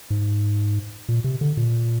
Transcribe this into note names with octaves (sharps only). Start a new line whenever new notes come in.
G#2
A#2
C3
D3
A#2